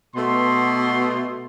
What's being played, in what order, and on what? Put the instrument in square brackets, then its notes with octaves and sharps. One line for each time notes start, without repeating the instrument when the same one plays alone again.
[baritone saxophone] B2 [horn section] A3 B3 C6